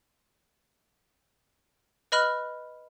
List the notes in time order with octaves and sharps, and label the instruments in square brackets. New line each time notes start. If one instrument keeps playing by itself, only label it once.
[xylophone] B4 D#5 B5 F6 F#6